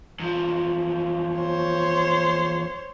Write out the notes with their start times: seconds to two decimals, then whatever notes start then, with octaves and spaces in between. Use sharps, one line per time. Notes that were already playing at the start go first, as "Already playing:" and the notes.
0.20 E2 F3
1.37 C5 C#5